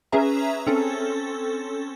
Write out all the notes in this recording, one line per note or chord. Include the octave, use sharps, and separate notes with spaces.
C#4 G#4 B4 E5 A#5
C4 C#4 A4